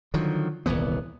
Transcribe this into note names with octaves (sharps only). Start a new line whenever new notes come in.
D3 D#3 F3 F#3
D#1 C2 E3 B3